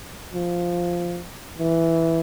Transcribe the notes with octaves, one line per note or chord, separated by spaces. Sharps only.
F3
E3